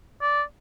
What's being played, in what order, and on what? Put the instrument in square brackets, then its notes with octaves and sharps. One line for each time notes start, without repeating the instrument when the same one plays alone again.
[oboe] D5